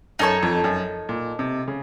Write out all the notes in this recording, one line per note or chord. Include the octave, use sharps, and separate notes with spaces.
F#2 D#4 A4 C#5 A5
F2
F#2
A#2
C3
C#3